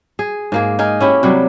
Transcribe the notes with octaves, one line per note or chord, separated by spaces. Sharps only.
G#4
G#2 A#3 G#4
D#4 G#4 A#4
C#4 E4 G4
C3 F#3 G3